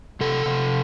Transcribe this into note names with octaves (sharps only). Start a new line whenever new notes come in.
C3 A4
C3